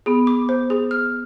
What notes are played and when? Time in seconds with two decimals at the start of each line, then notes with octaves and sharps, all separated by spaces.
0.06 B3 G#4
0.27 D6
0.49 C5
0.70 G#4
0.91 F6